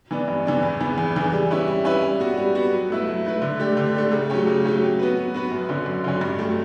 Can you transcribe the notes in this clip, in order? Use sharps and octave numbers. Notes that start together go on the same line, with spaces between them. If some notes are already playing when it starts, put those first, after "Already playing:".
E3 B3 D4
G2
E3 B3 D4
E2
C#3 E3 B3
E2
C#3 E3 B3
G3
C#4 E4 B4
G3
C#4 E4 B4
G3
B3 F#4
G3
B3 F#4
F#3
A3 E4 B4
F#3
A3 E4 B4
D3
A3 D4 G4
D3
A3 D4 G4
C#3
F#3 A3 C#4 G4
C#3
F#3 A3 C#4 G4
F#3
B3 F#4 B4
F#3
B3 F#4 B4
F#2
D3 F#3 C#4
F#2
D3 F#3 C#4
G2
F#3 A3